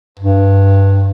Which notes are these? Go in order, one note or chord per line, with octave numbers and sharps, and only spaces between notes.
G2